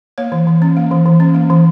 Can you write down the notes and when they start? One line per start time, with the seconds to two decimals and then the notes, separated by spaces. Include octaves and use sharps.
0.18 A#3 C#5
0.32 E3
0.47 E3
0.62 C#4
0.77 A#3
0.91 E3
1.06 E3
1.20 C#4
1.35 A#3
1.50 E3